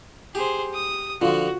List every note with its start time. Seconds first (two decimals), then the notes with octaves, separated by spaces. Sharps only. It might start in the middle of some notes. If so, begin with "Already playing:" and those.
0.35 G4 G#4 C5
0.74 D#6
1.22 D3 F3 F4 F#4